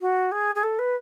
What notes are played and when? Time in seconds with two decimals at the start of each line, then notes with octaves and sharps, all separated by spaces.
0.01 F#4
0.32 G#4
0.55 G#4
0.63 A4
0.79 B4